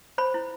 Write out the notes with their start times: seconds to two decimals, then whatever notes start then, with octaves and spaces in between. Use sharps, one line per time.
0.18 C5 B5
0.34 E4